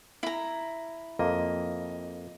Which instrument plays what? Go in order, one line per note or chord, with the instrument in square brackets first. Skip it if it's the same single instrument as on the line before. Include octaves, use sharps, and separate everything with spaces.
[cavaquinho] E4 A#5
[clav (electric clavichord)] F2 A#3 [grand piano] D#5